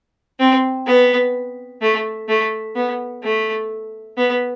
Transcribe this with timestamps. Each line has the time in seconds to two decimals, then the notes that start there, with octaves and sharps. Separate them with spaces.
0.39 C4
0.87 B3
1.82 A3
2.29 A3
2.76 B3
3.23 A3
4.18 B3